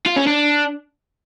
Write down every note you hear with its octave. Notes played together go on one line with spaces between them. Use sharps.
F4
C#4
D4